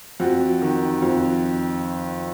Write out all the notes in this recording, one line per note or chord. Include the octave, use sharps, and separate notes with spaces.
F2 F#4
D#3
F2